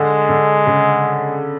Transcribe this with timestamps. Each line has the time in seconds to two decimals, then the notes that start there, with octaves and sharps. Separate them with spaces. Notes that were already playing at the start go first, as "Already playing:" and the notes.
Already playing: D3 G#3
0.29 D3
0.67 C#3